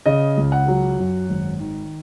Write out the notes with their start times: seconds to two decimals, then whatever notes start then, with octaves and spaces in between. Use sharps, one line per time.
0.06 C#3 D#5
0.37 C#2
0.52 F#5
0.68 F#3
0.99 F#2
1.29 G#1
1.60 D#3